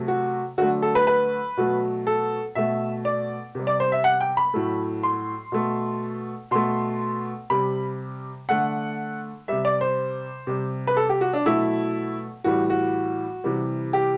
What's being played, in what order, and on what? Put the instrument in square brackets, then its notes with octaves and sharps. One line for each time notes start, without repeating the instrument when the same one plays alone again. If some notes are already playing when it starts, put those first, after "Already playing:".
Already playing: [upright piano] C3 F#3 A3
F#4
D3 F#3 A3 F#4
A4
B4
B4
B2 F#3 A3
A4
B2 A3 E5
D5
C3 G3
D5
C5
E5
F#5
G5
B5
A2 F#3 A3
C6
B2 A3
B2 A3 C6
C3 G3 B5
D3 A3 F#5
C3 G3 E5
D5
C5
C3 G3
B4
A4
G4
F#4
D4
B2 F#3 A3 E4
A2 E3 G3 F#4
F#4
C3 E3 G3
G4